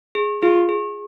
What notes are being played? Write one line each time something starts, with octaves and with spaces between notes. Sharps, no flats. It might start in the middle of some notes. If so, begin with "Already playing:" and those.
G#4
F4 G#4
G#4